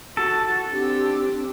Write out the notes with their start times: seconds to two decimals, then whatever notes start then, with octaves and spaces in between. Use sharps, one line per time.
0.17 F#4 A4
0.72 C4 D4 G4